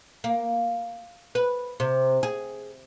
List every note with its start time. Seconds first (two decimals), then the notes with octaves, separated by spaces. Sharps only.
0.24 A#3
1.35 B4
1.80 C3
2.23 G#4